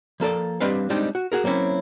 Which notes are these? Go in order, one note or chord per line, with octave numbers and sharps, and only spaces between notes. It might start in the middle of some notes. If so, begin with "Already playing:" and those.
F3 A#3 A4 D5
G3 C4 D4 B4 D#5 F5
G3 G#3 C4 D4 D#4
F#4
F#4 G#4 A#4
F#3 A#3 C4 C#4 E4